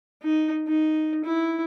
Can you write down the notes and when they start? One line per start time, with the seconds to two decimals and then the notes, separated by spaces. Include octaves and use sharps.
0.23 D#4
0.67 D#4
1.25 E4